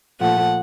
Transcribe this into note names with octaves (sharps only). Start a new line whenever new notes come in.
A#2 F3 A3 F#5